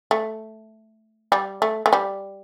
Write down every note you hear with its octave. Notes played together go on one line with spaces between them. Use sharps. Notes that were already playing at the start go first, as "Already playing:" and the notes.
A3
G3
A3
A3
G3